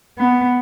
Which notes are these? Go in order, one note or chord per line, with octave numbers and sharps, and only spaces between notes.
B3